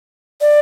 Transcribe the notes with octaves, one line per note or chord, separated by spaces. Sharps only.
D5